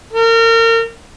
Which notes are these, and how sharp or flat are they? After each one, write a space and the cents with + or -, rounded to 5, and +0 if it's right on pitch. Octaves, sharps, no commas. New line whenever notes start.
A#4 -30